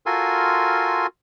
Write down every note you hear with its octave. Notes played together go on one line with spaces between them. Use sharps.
F4 F#4 A4 A#4 G#5 C6